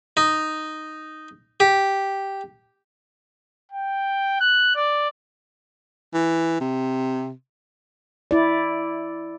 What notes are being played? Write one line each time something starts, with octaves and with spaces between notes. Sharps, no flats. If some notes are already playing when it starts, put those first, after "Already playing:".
D#4
G4
G5
F#6
D5
E3
C3
E4 D5